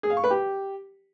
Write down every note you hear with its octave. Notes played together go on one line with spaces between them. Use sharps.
G#4
F5
C#6
B4
G4